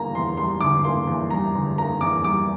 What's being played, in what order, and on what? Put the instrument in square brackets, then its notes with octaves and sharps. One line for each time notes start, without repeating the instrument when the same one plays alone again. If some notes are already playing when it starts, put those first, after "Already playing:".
Already playing: [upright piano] E2 D3 G3 A#3 A#5
E2 C6
G3 C6
D3 D6
A#3 C6
E2
G3 A#5
D3
A#3 A#5
E2 D6
G3 D6